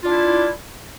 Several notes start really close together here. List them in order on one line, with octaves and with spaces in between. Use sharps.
F4 D4 E4